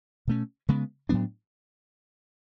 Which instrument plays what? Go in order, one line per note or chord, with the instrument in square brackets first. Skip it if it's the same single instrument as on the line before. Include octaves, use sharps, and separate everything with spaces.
[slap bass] B2 A3 C#4
C#3 G#3 B3
A2 F#3 B3 D4